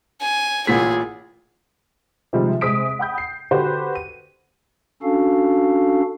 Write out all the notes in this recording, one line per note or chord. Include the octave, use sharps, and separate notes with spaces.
G#5
A1 A#2 G#4 B6
C3 D#3 F3 G3 G#3
C3 G#3 C4 D#6 B6 D7
F#5 G5 B5 D#6 G6
C7
D3 F#4 G4 B4 C5
D#7
C#4 D4 F#4 A4 F5